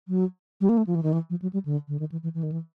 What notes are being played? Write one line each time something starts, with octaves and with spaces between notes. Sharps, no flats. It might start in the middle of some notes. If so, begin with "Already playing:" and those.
F#3
G3
A#3
A3
F3
E3
D#3
E3
F3
F#3
G3
D3
D3
D#3
E3
E3
E3
D#3
E3